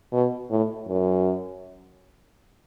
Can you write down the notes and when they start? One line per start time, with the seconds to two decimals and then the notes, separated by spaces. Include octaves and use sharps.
0.13 B2
0.50 A2
0.88 F#2